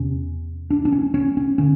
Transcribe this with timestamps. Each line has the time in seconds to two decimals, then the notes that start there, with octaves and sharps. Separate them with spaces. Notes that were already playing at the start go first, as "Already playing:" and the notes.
Already playing: E2 C3 C#4
0.70 D4
0.85 D4
0.92 C#4
1.14 C#4
1.37 C#4
1.58 D3 C#4